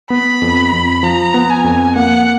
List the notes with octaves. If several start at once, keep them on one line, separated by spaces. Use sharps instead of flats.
B3 B5
F2
F2
F3 A#5
B3
G#5
F2
A#3 F#5